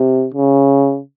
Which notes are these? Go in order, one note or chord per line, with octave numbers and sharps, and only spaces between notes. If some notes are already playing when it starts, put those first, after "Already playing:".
Already playing: C3
C#3